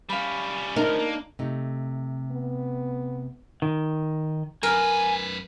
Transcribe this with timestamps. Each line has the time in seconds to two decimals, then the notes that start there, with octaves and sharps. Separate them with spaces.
0.10 G3 C#4 F5 B5
0.76 D2 F3 D4 D#4 A#4
0.99 A#3
1.39 C3 A3 D#4
2.31 B3
3.62 D#3
4.63 F#2 A#4 B4 G#5